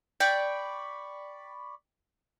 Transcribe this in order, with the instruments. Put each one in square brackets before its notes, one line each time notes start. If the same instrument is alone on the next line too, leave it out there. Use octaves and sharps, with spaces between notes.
[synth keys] D5 B5 C#6 [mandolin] G5